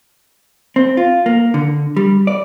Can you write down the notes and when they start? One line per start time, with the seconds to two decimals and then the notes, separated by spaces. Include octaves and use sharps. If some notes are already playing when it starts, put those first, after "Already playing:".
0.76 C4
0.97 F4
1.26 A#3
1.54 D3
1.96 G3
2.27 D5